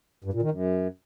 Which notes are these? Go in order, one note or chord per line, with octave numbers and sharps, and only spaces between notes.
G2
A#2
D#3
F#2